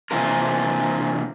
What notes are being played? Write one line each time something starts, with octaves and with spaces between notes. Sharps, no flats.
C3 E3 A#3 F4 A#4